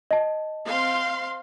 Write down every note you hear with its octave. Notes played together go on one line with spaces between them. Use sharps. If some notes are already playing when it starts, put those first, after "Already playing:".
D#5 A5
C4 F5 C6